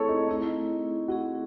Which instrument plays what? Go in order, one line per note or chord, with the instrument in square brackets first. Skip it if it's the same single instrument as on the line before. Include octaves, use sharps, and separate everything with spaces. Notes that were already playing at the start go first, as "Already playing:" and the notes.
Already playing: [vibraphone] A3 C4 E4 G#4 [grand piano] A4 C#5
[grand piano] D#4
[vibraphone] A3 C4 E4 G#4 [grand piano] D#4
[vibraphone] A3 C4 E4 G#4 [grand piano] F#4